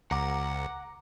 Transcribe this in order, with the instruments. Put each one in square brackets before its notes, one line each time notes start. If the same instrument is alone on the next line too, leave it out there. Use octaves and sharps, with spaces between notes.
[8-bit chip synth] C#2 [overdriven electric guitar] F#5 [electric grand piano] A#5 D6